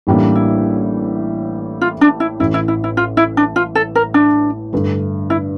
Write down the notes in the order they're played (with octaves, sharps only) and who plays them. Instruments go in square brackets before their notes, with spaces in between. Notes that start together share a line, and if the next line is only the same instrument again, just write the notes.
[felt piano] A1 A2 G3 A#3 D4
[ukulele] E4
F4
D4
E4
[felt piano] A1 A2 E3 [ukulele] E4
[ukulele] E4
E4
E4
F4
E4
D4
F4
A4
A#4
D4
[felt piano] G2 D3 A3
[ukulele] E4